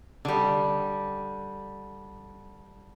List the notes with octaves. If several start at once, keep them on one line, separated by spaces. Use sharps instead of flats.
D3 G3